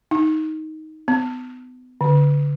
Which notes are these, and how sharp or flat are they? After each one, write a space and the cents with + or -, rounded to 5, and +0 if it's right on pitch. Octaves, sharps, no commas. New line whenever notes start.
D#4 +10
B3 +35
D3 -30